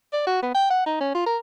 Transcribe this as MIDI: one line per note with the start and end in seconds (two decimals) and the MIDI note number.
0.13 0.26 74
0.26 0.39 66
0.42 0.52 59
0.54 0.66 79
0.70 0.84 78
0.86 0.95 63
1.00 1.11 61
1.15 1.24 65
1.26 1.37 70